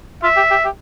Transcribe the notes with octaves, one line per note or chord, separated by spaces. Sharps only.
F4 E5
G4
G4
G4